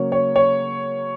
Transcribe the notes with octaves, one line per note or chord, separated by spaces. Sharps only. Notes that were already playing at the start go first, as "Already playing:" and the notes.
Already playing: C#3 F#3 A#3 C#5
C#5
C#5